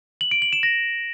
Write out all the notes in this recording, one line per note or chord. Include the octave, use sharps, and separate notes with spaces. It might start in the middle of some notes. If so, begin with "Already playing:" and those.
F#7
D7
F#7
E7
A#6